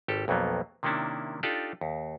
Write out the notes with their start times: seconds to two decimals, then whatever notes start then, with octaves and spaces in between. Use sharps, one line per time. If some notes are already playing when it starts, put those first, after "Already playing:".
0.08 G#1 G4 A4
0.28 B1 F2 F#3 A#3 B3
0.83 C3 D#3 A#3 C#4 D4 E4
1.43 D4 D#4 F4 G4 A4 D5
1.81 D#2